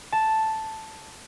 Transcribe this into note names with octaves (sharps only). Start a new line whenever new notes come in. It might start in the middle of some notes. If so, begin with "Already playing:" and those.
A5